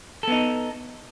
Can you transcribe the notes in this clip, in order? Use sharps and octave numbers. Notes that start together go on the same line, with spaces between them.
B3 D#4 A4